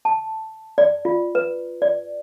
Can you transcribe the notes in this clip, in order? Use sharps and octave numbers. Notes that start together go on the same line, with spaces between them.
A5
D5
F4
B4
D5